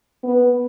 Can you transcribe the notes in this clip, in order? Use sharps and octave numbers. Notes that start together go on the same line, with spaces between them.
B3